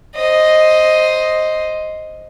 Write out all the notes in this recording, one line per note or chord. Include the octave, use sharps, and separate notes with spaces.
C5 D#5